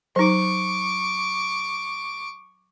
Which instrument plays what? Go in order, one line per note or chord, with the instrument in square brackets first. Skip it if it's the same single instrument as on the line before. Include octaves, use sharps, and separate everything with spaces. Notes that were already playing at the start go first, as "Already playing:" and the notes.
[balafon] F#3 D#4 [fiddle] C#6 D6